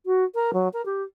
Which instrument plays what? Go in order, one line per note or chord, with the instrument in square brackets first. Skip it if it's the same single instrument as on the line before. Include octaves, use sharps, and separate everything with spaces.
[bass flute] F#4
A#4
F#3
A#4
G4